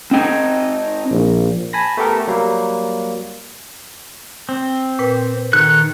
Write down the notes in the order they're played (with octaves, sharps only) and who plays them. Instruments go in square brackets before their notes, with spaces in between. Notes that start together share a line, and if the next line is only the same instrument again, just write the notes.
[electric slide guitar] C4 D#4 G5
[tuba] A#1
[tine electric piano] G#5 A5 B5 A#6
A3 B3 G4 A4 A#4
F#3 G3 A#3
[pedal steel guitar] C4
[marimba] A#2 B4 G5
[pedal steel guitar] D#3 A4 F#6